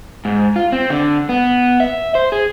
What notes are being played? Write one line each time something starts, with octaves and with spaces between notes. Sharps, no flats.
G#2
F4
C4
D3
B3
E5
C5
G#4